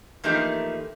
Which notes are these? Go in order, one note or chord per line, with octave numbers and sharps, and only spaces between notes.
E3 F3 A3 A#3 D#4 G4